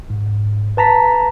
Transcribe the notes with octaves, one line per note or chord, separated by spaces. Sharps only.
G#2
B4 A5 A#5 B6